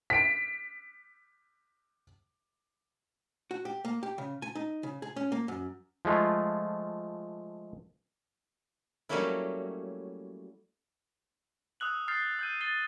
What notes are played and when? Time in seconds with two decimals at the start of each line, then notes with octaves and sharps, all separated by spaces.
0.10 B6 D7
3.51 F#4
3.65 G4
3.85 A#3
4.03 G4
4.18 C#3
4.42 G#5
4.55 D#4
4.83 C#3
5.02 G#4
5.16 C#4
5.32 A#3
5.48 F#2
6.05 F3 G#3 A3 F4
9.09 F#3 G3 A3 A#3 C#4 E4
11.80 D#6 E6 F#6 F#7
12.08 D#6 F6 G6 A6 C7
12.39 E6 G6 D#7
12.61 A6 C7 G7